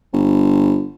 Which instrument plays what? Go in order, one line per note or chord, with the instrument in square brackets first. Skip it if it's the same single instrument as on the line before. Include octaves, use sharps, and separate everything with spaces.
[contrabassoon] G1